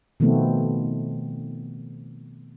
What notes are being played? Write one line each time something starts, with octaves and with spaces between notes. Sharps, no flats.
B2 D#3 F3 A3 B3 C4